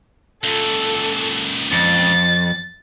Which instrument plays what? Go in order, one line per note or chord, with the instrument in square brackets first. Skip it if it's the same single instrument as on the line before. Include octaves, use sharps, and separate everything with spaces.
[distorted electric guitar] C#2 A#2 [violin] A4
[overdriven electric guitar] F2 [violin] A6